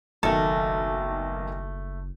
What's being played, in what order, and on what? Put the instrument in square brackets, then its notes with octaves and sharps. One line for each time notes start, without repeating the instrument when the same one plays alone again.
[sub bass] F#1 [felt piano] B1 D#3 [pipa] A3 A4